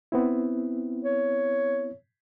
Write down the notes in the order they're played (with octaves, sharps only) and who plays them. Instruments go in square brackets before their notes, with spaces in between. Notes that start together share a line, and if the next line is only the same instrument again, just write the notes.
[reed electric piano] B3 C4 E4
[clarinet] C#5